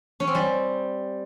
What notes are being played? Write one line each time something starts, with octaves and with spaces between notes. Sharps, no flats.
C#4
C4
G3